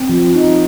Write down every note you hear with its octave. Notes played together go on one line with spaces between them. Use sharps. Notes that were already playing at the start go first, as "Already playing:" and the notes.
Already playing: C4
F3
D#4